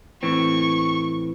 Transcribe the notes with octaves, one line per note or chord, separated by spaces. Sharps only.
A2 E3 C4 C#6